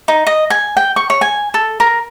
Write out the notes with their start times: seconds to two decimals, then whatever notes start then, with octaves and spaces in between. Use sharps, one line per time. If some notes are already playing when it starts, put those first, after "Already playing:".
0.08 D#4
0.27 D#5
0.50 G#5
0.77 G5
0.96 C#6
1.10 C#5
1.21 G#5
1.54 A4
1.80 A#4